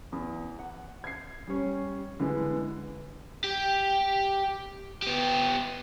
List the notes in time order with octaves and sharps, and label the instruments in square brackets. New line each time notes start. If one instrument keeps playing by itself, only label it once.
[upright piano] E2
F#5
G#6 C7
G3 C#4
D3 E3 G#3 B3
[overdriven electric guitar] G4
B3 G4